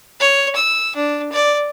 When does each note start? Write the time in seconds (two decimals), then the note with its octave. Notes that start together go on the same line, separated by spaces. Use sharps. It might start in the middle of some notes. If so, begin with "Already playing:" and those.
0.20 C#5
0.55 E6
0.96 D4
1.32 D5